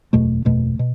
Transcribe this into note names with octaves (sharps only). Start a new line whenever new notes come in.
F#1 E2 B2 A3
F#1 E2 B2 A3
B2